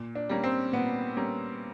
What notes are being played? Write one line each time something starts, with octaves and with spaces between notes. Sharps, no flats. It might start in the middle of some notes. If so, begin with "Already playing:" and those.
Already playing: A#2
D4
G3 A#3 C#4
C4
A#2 B3
G3 A#3 C#4